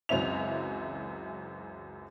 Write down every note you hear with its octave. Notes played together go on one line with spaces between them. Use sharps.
C#2 F#2 E3 C4 E5 F7